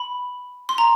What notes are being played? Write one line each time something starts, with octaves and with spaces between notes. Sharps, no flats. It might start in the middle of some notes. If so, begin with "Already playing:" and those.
Already playing: B5
C6
A#5